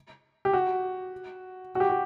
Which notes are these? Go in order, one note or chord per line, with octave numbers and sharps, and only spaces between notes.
G4
F#4
F#4
G4
F#4